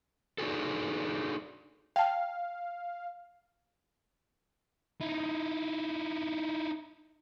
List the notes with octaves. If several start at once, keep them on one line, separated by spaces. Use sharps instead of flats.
D4 D#4 F#4 G#4 A4
F5 G5 A5
D#4 E4